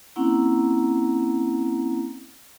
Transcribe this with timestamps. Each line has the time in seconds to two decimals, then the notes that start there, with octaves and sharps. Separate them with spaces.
0.16 A#3 C4 C#4 E4 F#5 A#5